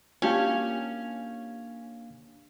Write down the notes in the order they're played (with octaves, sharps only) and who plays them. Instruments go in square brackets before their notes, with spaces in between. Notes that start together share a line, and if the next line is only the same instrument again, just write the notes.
[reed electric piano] A#3 D4 F5 [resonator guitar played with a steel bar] C#4 [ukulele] F4 G4 A5